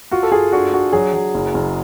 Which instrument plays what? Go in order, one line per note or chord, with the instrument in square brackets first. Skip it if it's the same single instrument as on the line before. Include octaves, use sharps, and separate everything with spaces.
[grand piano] F4 [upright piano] F#4
[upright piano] A4
[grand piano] F4 [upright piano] G#4
[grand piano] D4 [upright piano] F#4
[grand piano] D4 [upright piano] F#4
[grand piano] F#3 [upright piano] G#4
[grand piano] F#3
F#1
F#1